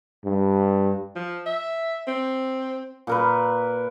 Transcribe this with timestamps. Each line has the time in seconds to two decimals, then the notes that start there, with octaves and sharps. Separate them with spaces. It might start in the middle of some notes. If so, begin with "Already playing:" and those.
0.25 G2
1.16 F3
1.46 E5
2.07 C4
3.07 A#2 A#4 B4